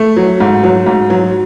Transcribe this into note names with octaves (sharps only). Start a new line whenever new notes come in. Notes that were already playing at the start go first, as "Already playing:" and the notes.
Already playing: A3
F#3
G#2
F#3
G#2
F#3